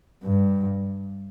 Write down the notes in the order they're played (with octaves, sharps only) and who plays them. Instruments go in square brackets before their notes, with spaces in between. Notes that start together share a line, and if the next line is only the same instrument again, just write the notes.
[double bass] G2